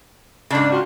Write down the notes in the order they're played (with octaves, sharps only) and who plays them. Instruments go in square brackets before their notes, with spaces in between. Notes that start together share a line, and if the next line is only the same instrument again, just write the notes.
[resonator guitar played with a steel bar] G#2 C#3 [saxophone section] D4
[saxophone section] D#3 F4 F#4